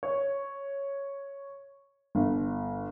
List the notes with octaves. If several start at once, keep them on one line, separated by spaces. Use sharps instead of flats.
C#5
G1